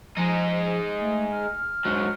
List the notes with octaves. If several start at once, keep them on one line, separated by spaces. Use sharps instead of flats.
F3 G#3 D#4
A3
F6
G#2 F#3